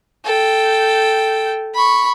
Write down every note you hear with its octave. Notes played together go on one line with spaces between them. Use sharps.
A4 G5
B5 C#6